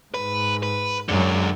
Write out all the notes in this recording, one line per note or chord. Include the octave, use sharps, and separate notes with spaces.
G#2 B4
B4
F#2 D3 F#3 G#3